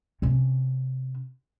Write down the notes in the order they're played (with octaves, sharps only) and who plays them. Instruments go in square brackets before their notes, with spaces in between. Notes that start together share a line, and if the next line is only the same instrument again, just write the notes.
[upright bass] C3 C#4